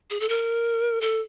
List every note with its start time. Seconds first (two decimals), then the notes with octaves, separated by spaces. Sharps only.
0.10 G#4
0.20 A4
0.29 A#4
1.01 A4